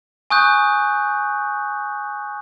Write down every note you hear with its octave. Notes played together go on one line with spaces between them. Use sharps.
G#5 C#6 D#6 F#6 G6